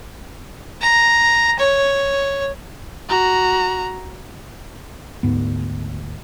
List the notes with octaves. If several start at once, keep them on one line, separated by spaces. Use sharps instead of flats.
A#5
C#5
F#4 A#5
D2 G#2 B3